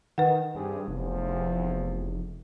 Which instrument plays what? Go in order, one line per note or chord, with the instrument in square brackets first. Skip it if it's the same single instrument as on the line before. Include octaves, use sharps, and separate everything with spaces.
[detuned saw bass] D#3 [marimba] B4 F#5
[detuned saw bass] G2 [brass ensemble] C4 G4 G#4
[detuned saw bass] F1 [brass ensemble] E2 F3